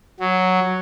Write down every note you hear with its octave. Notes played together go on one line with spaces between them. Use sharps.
F#3